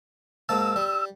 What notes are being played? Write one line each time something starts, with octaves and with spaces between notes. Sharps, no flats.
G#2 A#3 A5 E6
G3